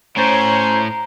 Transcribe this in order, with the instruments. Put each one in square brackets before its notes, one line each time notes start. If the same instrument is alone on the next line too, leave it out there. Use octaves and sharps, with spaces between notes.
[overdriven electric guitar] A2 [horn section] C#4 C5 C#5 [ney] A#5